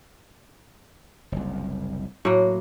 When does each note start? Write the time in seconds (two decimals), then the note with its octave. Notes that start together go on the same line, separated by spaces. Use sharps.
1.32 F#1 C2
2.25 A2 F#3 A#3 F#4